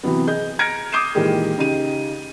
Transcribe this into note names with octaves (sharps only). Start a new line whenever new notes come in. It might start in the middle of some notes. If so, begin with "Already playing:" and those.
C3 E3 F#3 B3
G#4 D#5 G6
A#5 F6 G#6 A#6 C#7 D7
D6 D#6 G6 C7 D#7 E7
A#2 D#3 E3 G#3 G4 G#4
C#3 D#4 G4 D#7